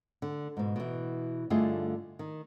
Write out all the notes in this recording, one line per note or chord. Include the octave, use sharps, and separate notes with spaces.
D3
G#2 B2
B2 E3
G2 D3 A3 F4 G#4 D#5
D#3